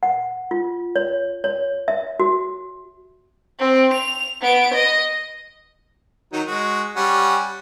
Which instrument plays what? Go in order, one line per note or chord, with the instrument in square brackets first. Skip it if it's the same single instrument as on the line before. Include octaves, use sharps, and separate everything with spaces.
[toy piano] F#5
F4
C#5
C#5
E5
F#4
[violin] C4
F7
B3 D7
D#5
[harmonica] D#3 F#3 D#4
G#3 F#4
G3 C#4 F#5